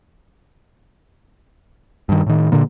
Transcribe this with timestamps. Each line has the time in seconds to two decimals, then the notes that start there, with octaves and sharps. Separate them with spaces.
2.09 G2 D#3
2.26 A2 D#3
2.52 A#2 D3 A#3